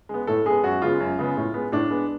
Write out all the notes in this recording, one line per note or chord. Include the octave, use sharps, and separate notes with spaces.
G#3 B3
A2 A4
G#3 B3 G#4
F#2 F#4
C#3 G#3 B3 F4
F#2
C#3 G#3 B3
A2
G#3 B3
A2 D4
G#3 B3